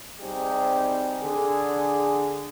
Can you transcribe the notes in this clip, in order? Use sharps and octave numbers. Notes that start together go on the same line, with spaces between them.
C3 G3 C4 D#4 G4 G#4
D3 G#4